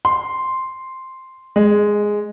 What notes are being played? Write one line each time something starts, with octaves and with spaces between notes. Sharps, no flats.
C6
G#3